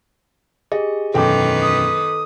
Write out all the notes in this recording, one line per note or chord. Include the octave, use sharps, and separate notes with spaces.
G4 G#4 D#5
E1 F#2 D#3 A4 B4 G5 D6
D#6